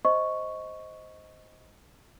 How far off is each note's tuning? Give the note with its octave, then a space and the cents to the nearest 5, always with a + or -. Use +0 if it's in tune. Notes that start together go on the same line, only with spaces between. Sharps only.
C5 +0 D#5 +10 C#6 +0